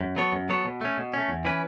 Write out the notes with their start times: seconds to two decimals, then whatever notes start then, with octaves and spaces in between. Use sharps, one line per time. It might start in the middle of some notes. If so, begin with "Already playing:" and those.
0.01 F#2
0.16 F#3 B3 A4 C#5
0.33 F#2
0.49 F#3 B3 A4 C#5
0.65 B2
0.81 A3 C#4
0.98 B2
1.14 A3 C#4
1.29 E2
1.45 E3 C#4 E4 B4